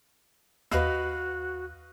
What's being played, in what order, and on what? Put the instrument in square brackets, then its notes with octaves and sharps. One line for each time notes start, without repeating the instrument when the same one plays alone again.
[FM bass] D#2 [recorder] F#4 [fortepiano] B4 D#5 F5